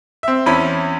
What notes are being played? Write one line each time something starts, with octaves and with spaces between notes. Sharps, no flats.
C4 E5
E2 C4 C#4 E4 B5